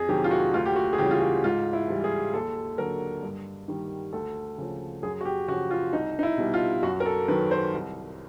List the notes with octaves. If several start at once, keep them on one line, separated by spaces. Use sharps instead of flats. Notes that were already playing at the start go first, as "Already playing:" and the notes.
Already playing: F2 G#4
C3 D#3 F#3 G4
F4
F#4
D2 F4
G4
F#4
G#4
C#3 E3 G3 G4
F4
F#4
G#2 F4
E4
E3 G3
G#4
D#2 A4
D3 F#3 A#4
G2
D#3 G3
D2 A4
C#3 F3
F#2 G#4
F#4
G4
C#3 F3 F#4
F4
C2 D#4
D#4
E4
B2 G3
F4
F#2 F#4
A#4
A4
D#3 F#3 B4
C5
C2